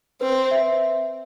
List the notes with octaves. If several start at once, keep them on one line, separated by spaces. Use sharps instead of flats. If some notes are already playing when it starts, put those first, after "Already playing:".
C4 B4
E5